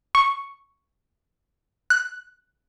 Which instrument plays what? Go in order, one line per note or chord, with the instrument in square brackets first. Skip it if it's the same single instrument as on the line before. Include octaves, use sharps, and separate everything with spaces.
[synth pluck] C#6
F#6